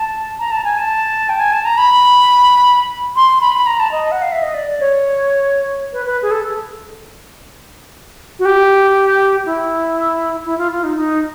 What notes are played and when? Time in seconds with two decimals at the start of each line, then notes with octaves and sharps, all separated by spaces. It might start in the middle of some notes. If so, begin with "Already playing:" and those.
Already playing: A5
0.39 A#5
0.51 A5
0.64 G#5
0.78 A5
1.29 G5
1.39 G#5
1.53 A5
1.65 A#5
1.78 B5
3.16 C6
3.41 B5
3.54 B5
3.67 A#5
3.80 A5
3.92 D#5
4.12 F#5
4.22 F5
4.32 E5
4.43 D#5
4.54 D5
4.68 D5
4.80 C#5
5.93 B4
6.06 B4
6.22 G#4
6.31 A4
8.39 F#4
8.45 G4
9.46 E4
10.46 E4
10.58 F4
10.72 F4
10.84 D#4
10.97 D#4